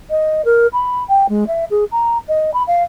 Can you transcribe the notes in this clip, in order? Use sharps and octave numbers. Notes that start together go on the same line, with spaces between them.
D#5
A#4
B5
G5
G#3
E5
G#4
A#5
D#5
B5
F5